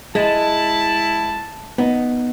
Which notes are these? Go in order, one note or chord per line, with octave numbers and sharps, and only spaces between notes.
G#3 E4 A5
B3 D#4